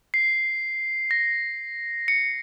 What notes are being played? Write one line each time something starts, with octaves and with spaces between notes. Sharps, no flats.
C7
A#6
C#7